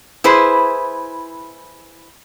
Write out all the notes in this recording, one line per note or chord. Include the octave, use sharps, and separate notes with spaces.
E4 G#4 B4 C5